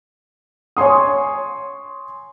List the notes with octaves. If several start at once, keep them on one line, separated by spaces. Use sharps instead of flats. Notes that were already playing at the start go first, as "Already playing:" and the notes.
C#5 G#5 C6 D#6